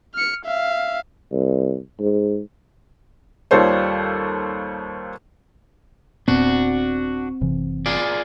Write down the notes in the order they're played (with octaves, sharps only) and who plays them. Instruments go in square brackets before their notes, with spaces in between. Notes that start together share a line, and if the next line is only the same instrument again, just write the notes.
[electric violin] F6 C#7
E5 F5
[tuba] C2
G#2
[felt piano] D#2 G3 F4 A4 C5 C#5
[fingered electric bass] D#1 A#2 B3 [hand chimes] C4 [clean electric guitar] D4 F#4
[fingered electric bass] F#1 C3 E3
[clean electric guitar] F4 G#4 D5